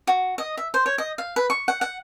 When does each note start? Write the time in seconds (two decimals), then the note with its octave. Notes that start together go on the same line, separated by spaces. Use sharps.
0.07 F#4
0.38 D#5
0.57 E5
0.74 C5
0.86 C#5
0.98 D#5
1.18 F5
1.36 B4
1.50 C#6
1.68 F#5
1.81 F#5